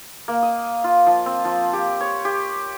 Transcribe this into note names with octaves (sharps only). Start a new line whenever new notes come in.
A#3
D#5
F4
F3
C4
F3
G4
C#5
G4